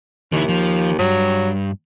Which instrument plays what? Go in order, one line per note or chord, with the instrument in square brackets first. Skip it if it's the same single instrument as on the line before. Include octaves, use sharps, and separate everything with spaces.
[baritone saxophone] D#2 [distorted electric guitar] D#3 E4
[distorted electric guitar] F3
[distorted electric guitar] G2 [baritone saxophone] F#3